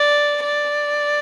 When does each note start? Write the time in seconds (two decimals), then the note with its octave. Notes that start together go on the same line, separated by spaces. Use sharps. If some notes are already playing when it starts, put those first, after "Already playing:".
Already playing: D5
0.43 D5